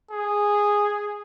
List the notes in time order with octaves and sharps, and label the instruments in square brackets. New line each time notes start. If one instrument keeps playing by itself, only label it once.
[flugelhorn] G#4